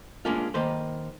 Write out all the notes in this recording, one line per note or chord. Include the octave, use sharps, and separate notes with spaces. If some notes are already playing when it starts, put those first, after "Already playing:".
G#3 A#3 C#4 D4 F4
D#3 A#3 B4 C5